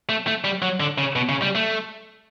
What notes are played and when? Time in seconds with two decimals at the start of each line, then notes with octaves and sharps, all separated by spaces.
0.09 A3
0.27 A3
0.44 G3
0.62 F#3
0.80 D3
0.98 C#3
1.16 B2
1.29 C#3
1.42 G3
1.55 A3